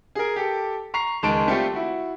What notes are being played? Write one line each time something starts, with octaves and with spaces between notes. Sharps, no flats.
G#4 A#4
G4 A4
A#5 C#6 C7 F7
C#2 D#3 G#3 A5 C#6 D7
G3 A3 C4 F4 G4 A4
E4 F#4